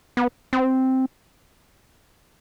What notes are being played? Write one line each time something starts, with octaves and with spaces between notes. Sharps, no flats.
B3
C4